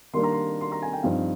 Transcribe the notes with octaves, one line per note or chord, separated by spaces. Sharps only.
D#3 G3 A#3 D4 C6
A#5
C6
C6
A#5
G#5
G5
G2 F3 C4 D#4 F5